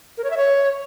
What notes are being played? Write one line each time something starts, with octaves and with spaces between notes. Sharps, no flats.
A#4
C#5
E5
C#5